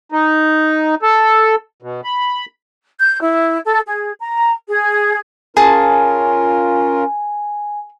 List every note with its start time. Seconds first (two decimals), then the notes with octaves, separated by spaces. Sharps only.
0.12 D#4
1.02 A4
1.82 B2
2.04 B5
2.99 G6
3.22 E4
3.65 A4
3.87 G#4
4.20 A#5
4.68 G#4
5.57 C#4 F4 G#4 A#4 G#5 A5